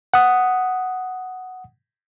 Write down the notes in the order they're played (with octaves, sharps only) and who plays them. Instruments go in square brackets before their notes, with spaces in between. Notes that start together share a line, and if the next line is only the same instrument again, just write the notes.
[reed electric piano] F#5 D#6